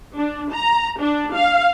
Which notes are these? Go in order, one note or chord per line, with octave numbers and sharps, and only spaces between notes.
D4
A#5
D4
F5